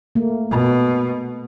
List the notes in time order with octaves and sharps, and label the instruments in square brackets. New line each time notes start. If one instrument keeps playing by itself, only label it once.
[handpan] A3 A#3
[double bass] B2